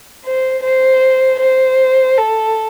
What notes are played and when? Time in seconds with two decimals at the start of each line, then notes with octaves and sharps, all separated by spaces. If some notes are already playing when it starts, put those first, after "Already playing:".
0.25 C5
0.63 C5
1.40 C5
2.18 A4